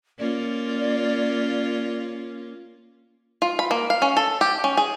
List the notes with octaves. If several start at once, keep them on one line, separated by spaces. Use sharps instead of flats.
A#3 C#4 F4 D5
F4
B5
A#3
F5
C#4
A4
G4
C#4
G#4